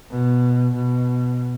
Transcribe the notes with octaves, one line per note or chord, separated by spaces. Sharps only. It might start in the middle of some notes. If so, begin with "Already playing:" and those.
B2
B2